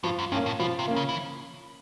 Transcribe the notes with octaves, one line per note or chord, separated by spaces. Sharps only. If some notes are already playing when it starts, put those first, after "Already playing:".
G2 F3
F#2
G2 A#3 C#4
A2
B2 F3
C3
A#3 C#4
C#3
E3